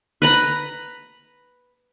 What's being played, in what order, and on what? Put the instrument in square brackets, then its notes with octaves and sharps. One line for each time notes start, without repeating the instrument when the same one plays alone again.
[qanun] B4 A#5 B5